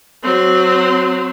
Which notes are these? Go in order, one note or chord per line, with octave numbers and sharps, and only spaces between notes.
F#3 C4